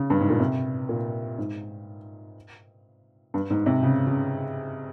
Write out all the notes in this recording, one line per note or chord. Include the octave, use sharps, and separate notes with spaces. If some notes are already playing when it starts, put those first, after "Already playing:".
Already playing: C#3
G2
G#2
A#2
C3
A#2
G#2
G2
G#2
C3
C#3
C#3